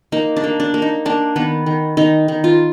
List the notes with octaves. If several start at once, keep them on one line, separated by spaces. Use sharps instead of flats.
A#3 D#4
D4
A#3
D4
A#3
D#4
A#3 D4
D#3 B3
D#3
D#3 D#4
D#3
F4